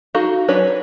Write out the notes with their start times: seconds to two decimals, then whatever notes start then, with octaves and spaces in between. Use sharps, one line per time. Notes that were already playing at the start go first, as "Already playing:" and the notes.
0.14 D#4 F#4 A4 F5
0.48 F#3 C#4 D4 B4 C#5